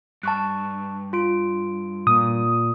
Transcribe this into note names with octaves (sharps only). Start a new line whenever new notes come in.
G2 A5 C#6 F#6
F4 D7
A#2 D#6